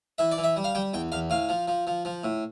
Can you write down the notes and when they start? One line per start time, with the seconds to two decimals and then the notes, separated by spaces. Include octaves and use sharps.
0.18 E3 E5
0.32 D5
0.38 E3
0.44 E5
0.57 G3
0.64 F5
0.75 G3 G5
0.94 E2 G5
1.12 E2 F5
1.30 A2 F5
1.49 F3
1.68 F3
1.87 F3
2.05 F3
2.24 A2